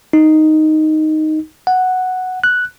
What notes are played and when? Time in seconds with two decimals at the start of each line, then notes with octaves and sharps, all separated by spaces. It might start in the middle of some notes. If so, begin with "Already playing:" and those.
0.13 D#4
1.67 F#5
2.44 F#6